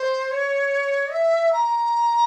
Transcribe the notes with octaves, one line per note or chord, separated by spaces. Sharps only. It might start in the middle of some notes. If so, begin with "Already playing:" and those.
Already playing: C5
C#5
E5
A#5